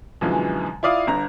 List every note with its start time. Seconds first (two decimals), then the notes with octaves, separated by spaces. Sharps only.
0.21 F#2 B2 D3 E3 F3 G#3
0.83 E4 F4 D5 F5 D#6
1.07 G1 D3 A#5